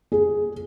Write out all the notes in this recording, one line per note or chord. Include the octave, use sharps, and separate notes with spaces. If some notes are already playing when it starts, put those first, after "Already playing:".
G#4